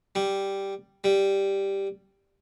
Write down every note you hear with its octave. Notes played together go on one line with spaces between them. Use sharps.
G3
G3